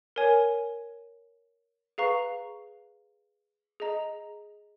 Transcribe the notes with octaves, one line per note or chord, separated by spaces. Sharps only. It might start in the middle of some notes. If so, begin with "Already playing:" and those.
A#4 C#5 G#5
G#4 B4 F5 A#5 C#6
G#4 D#5 A#5